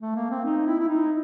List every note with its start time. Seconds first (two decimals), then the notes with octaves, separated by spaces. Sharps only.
0.01 A3
0.15 A#3
0.30 C4
0.45 D#4
0.66 E4
0.80 E4
0.88 D#4